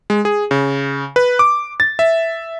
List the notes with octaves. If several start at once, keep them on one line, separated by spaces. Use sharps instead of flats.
G#3
G#4
C#3
B4
D6
A6
E5